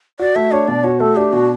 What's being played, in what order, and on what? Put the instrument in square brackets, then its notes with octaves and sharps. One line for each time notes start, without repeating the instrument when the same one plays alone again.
[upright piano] F#4 [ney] D5
[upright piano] A3 [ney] E5
[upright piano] D4 [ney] C#5
[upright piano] B2 [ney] D5
[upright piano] F#4 [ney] C#5
[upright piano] A3 [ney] A4
[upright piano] D4 [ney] G4
[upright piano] B2 [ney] F#4